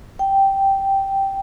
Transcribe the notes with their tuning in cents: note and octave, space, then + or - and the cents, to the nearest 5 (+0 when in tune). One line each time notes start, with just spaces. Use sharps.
G5 -5